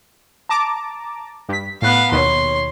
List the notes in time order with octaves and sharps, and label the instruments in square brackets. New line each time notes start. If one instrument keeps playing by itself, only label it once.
[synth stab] A5 A#5 D6
G2 B6
[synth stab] A2 F#6 [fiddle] B3 F5
[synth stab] D#2 B2 [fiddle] C#5 C6